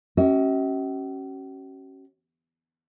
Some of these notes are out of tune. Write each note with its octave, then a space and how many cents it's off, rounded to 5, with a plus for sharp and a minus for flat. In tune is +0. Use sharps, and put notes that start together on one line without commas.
C#4 -20 F#4 +45 E5 -45